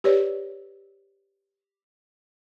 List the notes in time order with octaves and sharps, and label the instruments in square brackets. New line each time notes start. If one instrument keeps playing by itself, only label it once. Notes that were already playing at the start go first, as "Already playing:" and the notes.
[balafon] G4 B4 C#5 D5